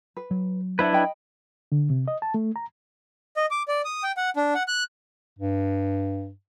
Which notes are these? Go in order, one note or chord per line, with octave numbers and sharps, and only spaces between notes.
B4
F#3
D4 E4 B4 C5 E5 F#5
D#5 G5 B5
D3
C3
D#5
A5
A3
A#5
D#5
D6
D5
D#6
G5
F#5
D4
F#5
F#6
G2